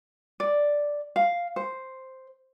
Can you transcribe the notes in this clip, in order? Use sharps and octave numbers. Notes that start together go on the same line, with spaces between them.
D5
F5
C5